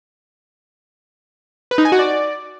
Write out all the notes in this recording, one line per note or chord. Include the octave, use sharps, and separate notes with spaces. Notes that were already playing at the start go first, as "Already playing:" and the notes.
B4
D#4
G#5
F#4
D5